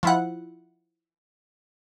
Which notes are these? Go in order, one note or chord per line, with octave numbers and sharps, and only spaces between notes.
F3 E4 F#5